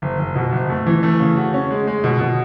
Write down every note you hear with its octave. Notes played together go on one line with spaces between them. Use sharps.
F#1
F#1
B2
F#1
A3
E3
A3
C#3
F#4
C#4
G#3
G#3
B2
B2